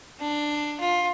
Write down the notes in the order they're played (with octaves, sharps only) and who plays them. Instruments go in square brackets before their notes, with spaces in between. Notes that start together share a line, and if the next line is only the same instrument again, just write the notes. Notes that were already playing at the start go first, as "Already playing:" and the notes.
[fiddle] D4
F4